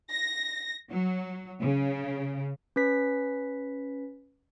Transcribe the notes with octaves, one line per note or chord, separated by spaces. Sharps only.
A#6
F#3
C#3
C#4 B4 B6